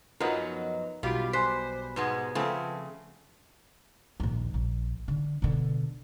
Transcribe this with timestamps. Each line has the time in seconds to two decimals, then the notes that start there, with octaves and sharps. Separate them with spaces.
0.20 F#2 F3 F#3 B3 D#4 A#4 B4
1.03 B1 B2 G3 F4 G4 B5 D6
1.33 C5 G#5 F#6 B6
1.96 G#2 B2 G#3 B4 F#5 G#6
2.35 C#3 F3 A3 C4 A4
4.20 A#1 D#2
4.54 A#1
5.08 D3
5.42 B2 D3